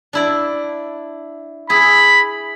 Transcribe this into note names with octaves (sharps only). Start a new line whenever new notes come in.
D4 E4 D5
E4 G#4 B5